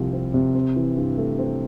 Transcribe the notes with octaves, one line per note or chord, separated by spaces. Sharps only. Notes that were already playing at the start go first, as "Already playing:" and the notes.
Already playing: C2 C3 F3 C4
C4
C3
C4
E3
G2
A3
C4